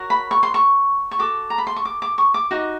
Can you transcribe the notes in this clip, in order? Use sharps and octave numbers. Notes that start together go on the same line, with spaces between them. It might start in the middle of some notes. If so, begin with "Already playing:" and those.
Already playing: F#4 A#4 C#5
B5
C#6
C6
C#6
C#6
F#4 A4 D6
A#5
B5
C6
C#6
D6
D6
C#6
D6
D#4 F#4